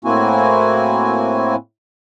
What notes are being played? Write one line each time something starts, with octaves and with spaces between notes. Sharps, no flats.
A2 A#3 C4 E4 F#4 G#5